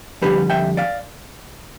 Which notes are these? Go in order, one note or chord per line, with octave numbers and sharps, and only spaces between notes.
F2 D3 G3 G4 B4
E5 G5
D5 F5